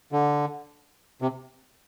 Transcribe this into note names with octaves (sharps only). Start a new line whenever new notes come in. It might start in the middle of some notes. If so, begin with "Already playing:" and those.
D3
C3